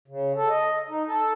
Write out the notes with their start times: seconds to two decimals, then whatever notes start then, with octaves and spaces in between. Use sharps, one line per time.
0.08 C#3
0.35 A4
0.49 D#5
0.89 D#4
1.07 A4